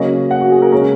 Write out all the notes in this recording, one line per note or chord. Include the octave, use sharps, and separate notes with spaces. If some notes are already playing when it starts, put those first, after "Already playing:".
Already playing: C#3 F#3 A#3 C#4 D#5
F#5
F#4
G#4
A#4
C#3 G#3 C#4 A#4